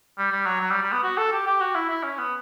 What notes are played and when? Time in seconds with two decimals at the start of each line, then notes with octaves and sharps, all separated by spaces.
0.18 G3
0.32 G3
0.46 F#3
0.60 F#3
0.71 G3
0.82 G3
0.92 B3
1.03 F#4
1.17 A4
1.32 G4
1.46 G4
1.60 F#4
1.75 E4
1.90 E4
2.03 C#4
2.18 B3